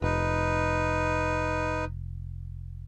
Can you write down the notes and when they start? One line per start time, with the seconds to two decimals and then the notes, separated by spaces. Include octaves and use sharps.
0.02 F1 D#4 B4